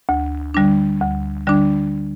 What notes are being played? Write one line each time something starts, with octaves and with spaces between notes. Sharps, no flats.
D2
D3 G3 D4
D2
D3 G3 D4